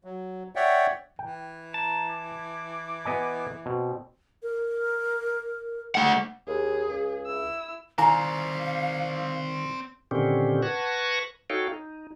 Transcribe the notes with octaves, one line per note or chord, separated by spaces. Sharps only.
F#3
C#5 D5 E5 F#5 G5
E3 G5
A5 A#5
D6
B3 D#5 G#5
B2 C4
A#4
A3 F#5
D#2 G#4
C#2
E4 E6
D#3 C4 E4 D5 F5 G#5 A#5
A#2 D3 D#3 C4 C#4 G4
B4 F#5 A5 C#6 G#6 A#6
D#4 F#4 A4 C#5 F5 G5
D#4